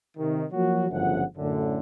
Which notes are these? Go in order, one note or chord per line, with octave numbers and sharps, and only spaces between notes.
C3 D#3
F3 F#3 A#3 F#4
G1 F#2 A2 C#3 F3 F#5
F#2 A2 D3